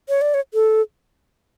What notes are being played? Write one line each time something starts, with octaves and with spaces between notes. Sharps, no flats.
C#5
D5
C#5
A4